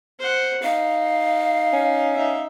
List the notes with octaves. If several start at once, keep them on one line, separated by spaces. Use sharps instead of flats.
C5 F#5
D#4 F5
C#4
D#4 E5